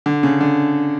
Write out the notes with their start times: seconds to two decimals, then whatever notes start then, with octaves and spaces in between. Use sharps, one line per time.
0.06 D3
0.23 C#3
0.41 D3